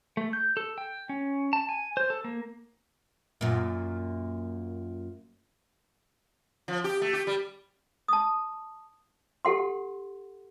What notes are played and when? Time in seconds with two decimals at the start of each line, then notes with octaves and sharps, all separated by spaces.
0.17 A3
0.33 G6
0.57 A4
0.78 G5
1.09 C#4
1.53 A5
1.69 G#5
1.97 C5
2.10 A4
2.24 A#3
3.41 F#2 A#2
6.68 F3
6.84 G4
7.02 A3
7.13 G4
7.27 G3
8.08 A5 D#6
9.45 G4 A4 F#5 C6